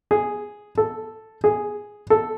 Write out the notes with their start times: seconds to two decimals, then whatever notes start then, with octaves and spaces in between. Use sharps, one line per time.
0.11 G#4
0.78 A4
1.44 G#4
2.10 A4